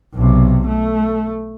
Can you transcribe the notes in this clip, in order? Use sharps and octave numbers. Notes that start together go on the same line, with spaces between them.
B1 C3
A3